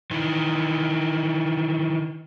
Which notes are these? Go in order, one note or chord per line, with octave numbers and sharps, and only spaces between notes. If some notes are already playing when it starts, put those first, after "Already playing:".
D#3 E3